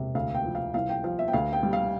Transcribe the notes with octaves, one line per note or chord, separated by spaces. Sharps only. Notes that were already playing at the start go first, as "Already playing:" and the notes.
Already playing: E1 C3
D2 F5
G5
F3
F5
C2 F5
G5
F3 F5
E5
G5
D2 F5
G5
G3
F5